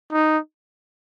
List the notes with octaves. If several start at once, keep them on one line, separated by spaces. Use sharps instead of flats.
D#4